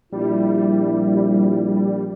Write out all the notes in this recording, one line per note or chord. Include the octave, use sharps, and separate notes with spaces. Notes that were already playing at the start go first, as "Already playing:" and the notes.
A#1 G3 E4